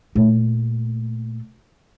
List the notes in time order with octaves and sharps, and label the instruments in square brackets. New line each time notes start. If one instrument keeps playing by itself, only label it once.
[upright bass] A#2 A3